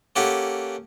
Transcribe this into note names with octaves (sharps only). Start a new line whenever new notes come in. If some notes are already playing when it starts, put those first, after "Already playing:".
A#3 C#4 G4 A4 F#5